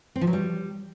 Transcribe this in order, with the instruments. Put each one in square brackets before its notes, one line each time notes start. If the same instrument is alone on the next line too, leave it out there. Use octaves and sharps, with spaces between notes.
[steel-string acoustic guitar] C4
F3
F#3
G3